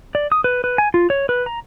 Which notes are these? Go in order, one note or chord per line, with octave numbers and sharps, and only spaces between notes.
D5
D#6
B4
B4
G#5
F4
C#5
B4
A#5